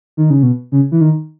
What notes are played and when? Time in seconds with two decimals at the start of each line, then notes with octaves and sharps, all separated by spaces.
0.17 D#3
0.30 C#3
0.43 B2
0.72 C#3
0.92 E3
1.01 D#3